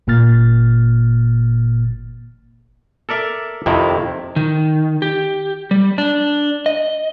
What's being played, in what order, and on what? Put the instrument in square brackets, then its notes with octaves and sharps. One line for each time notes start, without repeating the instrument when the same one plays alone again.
[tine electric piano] G1 A#2 A#3 F6 A6
[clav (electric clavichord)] A4 A#4 D5 E5
F2 C3 D#3 E4
[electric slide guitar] D#3
G4
G3
D4
D#5